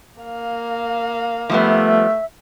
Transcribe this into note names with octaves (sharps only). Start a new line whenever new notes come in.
A#3 F5
F3 G3 A3 B3 E5